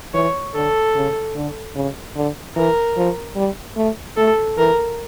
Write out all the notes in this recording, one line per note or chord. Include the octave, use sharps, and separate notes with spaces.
E3 C#5
D3 A4
C#3
D3
C#3
D3
E3 A#4
F3
G3
A3
A3 A4
E3 A#4